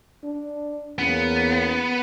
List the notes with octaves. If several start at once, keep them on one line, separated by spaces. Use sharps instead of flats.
D4
E2 A#3 B3 C#4